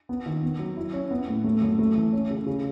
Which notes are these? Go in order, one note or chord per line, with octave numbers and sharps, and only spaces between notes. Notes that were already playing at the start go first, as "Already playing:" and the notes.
B3
D#3
B3
F#3
E4
C#4
B3
A2
A3
F#2
A3
E3
C#4
C#3
C#3